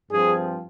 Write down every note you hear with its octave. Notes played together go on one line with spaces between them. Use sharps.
G2 F3 C4 G#4